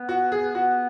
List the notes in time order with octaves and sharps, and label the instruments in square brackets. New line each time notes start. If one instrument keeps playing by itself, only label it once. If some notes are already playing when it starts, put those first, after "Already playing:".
Already playing: [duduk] B3
[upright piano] F#4
G#4
[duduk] B3 [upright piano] F#4